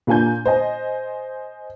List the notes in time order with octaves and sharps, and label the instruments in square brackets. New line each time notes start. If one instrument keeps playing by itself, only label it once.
[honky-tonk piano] A#2 A#3 D4 G#5 G6
C5 D#5 G#5